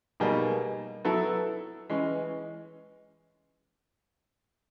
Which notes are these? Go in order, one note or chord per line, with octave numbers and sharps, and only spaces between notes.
B2 G3 A#3 D#4 G#4
F#3 B3 E4 A4
E3 G#3 C#4